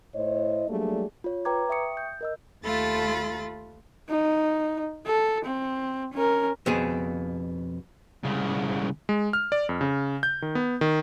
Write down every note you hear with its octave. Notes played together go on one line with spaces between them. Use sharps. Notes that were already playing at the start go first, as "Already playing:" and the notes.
A2 E4 C5 C#5 D#5
F#3 G3 A3 A#3 D4 G#4
F4 C#5
B4 G5 A#5 D6 G#6
E5 G5 C#6 D#6 C#7
G6
A#4 D#5 E6
D#2 A3 F4 A4 B5 A6
D#4
A4
C4
C#4 A#4
F2 B2 G#4
C2 C#3
G#3
F6
D5
F2
C#3
G6
D#3
B3
D#3